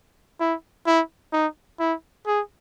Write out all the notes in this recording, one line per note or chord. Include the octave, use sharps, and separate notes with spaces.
E4
E4
D#4
E4
G#4